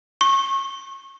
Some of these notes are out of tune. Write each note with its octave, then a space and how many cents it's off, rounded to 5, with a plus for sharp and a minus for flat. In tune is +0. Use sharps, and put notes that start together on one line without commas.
C#6 -30